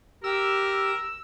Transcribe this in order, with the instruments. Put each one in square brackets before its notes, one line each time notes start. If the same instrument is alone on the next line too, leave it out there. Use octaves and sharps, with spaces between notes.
[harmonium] G4 [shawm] A#4 [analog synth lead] E6